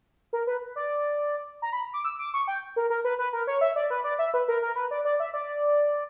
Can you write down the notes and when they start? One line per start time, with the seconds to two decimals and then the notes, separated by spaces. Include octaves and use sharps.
0.33 A#4
0.47 B4
0.76 D5
1.62 A#5
1.73 B5
1.93 D6
2.05 E6
2.19 D6
2.34 C#6
2.48 G5
2.76 A#4
2.90 A#4
3.04 B4
3.19 B4
3.33 A#4
3.47 C#5
3.61 E5
3.76 D5
3.90 B4
4.04 D5
4.19 E5
4.34 B4
4.48 A#4
4.62 A#4
4.76 B4
4.91 D5
5.05 D5
5.20 E5
5.34 D5